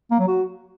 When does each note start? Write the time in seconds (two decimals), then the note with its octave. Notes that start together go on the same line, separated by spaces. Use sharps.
0.11 A#3
0.19 F#3
0.28 F#4